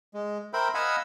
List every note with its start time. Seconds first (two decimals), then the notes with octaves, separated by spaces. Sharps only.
0.14 G#3
0.53 A#4 C5 E5 G5 B5
0.75 D#5 F5 F#5 G#5 B5 E6